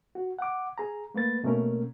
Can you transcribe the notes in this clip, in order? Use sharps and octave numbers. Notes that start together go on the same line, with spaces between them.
F#4
F#5 D6
G#4 A#5
A3 A#3 B4 A6
B2 A3 A#3 C#4 A#4